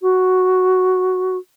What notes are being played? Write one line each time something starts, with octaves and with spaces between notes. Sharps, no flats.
F#4